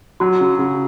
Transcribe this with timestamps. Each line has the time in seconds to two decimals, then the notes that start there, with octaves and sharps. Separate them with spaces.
0.20 F#3 F#4
0.41 C#3
0.59 C#3